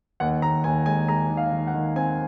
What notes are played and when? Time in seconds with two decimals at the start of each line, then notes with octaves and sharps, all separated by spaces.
0.20 D#2 F#5
0.42 D#2 A#5
0.64 D#2 G#5
0.86 G#3 G#5
1.08 G#3 A#5
1.30 D#3
1.37 F5
1.52 D#3
1.67 F#5
1.74 D#3
1.96 C4 G#5